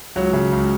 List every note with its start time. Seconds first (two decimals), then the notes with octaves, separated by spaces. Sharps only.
0.15 C#2 F#3
0.33 C#3
0.52 C#2